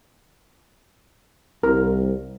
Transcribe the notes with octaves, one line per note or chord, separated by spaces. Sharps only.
C2 A#4